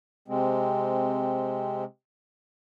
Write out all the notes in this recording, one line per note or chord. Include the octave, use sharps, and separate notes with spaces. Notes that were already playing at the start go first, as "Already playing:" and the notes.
C3 G#3 C4